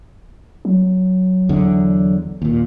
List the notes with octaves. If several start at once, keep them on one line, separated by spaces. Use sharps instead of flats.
F#3
E2 D3
D#2 A#2